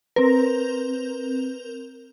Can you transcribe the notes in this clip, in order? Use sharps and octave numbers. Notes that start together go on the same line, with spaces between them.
C4 A#4 B4